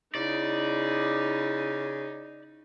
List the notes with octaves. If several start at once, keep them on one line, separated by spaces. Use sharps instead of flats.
C#3 D#4 E4 D5